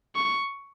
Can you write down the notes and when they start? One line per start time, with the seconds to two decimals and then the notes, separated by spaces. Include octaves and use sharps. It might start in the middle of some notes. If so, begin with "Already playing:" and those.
0.16 C#6